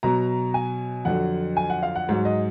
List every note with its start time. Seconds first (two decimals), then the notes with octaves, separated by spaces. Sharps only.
0.03 B2 F#3 A#5
0.54 G#5
1.05 F2 D3 F#3 F#5
1.57 G#5
1.70 F#5
1.83 F5
1.95 F#5
2.09 G#2 F#3
2.25 D#5